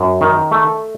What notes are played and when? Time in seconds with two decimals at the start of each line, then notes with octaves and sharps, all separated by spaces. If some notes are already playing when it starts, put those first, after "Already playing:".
Already playing: F#2
0.21 D#3
0.51 A3